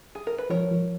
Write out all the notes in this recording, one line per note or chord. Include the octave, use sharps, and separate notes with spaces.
G#4
A#4
B4
F3 A#4 C#5
F3